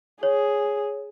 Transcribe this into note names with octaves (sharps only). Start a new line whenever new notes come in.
G#4 C#5